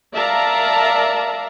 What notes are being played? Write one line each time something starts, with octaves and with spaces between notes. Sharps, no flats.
A#4 D5 E5 F5 A5 A#5